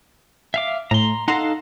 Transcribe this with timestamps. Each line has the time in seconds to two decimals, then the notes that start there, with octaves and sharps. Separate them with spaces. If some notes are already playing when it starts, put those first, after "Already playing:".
0.54 E5 F5 D6
0.91 A2 A#5 C6
1.28 D#4 A4 F5 F#5 A#5 C6